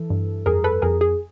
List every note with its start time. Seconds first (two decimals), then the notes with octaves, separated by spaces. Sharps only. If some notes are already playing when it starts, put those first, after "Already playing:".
Already playing: E3 A4
0.10 G2
0.46 F2 G#4 A#4
0.64 A4 B4
0.82 F2 G#4 A#4
1.01 G#4